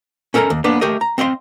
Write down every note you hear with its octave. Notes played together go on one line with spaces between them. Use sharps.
C#4 A4 A#4 A5 A#5
D#2
A#3 B3 D4 B4
A3 G4 A#4 D#5
A#5
C4 D#5 F5 C6